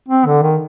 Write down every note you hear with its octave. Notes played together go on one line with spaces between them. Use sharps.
C4
D3
D#3